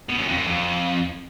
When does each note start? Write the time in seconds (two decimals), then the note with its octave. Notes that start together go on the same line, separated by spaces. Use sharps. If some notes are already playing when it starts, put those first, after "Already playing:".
0.09 B2
0.19 F#2
0.28 F2
0.38 F#2
0.47 F2